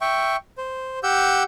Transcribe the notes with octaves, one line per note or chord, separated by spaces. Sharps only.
E5 G5 C#6
C5
G4 F#5 E6 G6